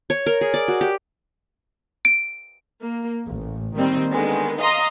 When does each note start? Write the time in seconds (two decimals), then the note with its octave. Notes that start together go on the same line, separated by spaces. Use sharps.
0.10 C#5
0.26 A#4
0.41 G#4
0.54 D5
0.68 F#4
0.81 G4
2.05 D7
2.81 A#3
3.24 A1
3.75 D#3 G3 A#3 C4 D#4
4.09 D3 D#3 G#3 B3
4.60 D#5 F5 A#5 C6 D#6 A#6